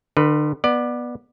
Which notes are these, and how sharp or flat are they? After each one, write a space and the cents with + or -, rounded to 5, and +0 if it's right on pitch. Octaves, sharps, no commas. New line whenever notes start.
D3 +40 B4 +0
B3 -15 D5 +20